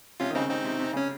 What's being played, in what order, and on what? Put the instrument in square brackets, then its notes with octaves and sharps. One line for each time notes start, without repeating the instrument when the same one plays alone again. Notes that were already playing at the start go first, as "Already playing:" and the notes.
[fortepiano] C3 [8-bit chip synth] C#4 F4
[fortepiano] D#3
[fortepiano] C#3 [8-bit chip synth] C4 D#4
[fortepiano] C#3 [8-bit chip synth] C4 D#4
[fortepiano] C3
C3
[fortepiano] C#3 [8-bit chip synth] C#4